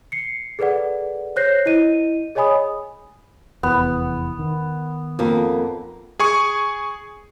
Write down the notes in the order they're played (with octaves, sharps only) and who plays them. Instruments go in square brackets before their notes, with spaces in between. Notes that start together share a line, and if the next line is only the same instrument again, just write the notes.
[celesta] C7 C#7
G#4 A4 B4 D5 F#5
C5 C#5 F#6 G6 A#6 C7
E4 D#5 D#7
G#4 C#5 D#5 G#5 B5 D#6
[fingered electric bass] F1 E2 [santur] B3
[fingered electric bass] D#3
[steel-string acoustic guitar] F2 A#3
[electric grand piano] G#4 G#5 C#6